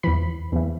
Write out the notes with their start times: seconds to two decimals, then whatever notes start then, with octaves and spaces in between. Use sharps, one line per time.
0.03 E2 E3 B5
0.52 E2 E3